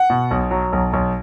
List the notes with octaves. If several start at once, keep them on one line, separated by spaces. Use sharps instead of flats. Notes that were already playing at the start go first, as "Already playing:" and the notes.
Already playing: F#5
B2
B1
F#3
B1
B1